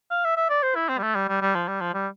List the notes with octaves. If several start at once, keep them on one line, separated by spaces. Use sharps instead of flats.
F5
E5
E5
D5
C5
E4
C4
G3
A3
G3
G3
G3
F3
G3
F3
G3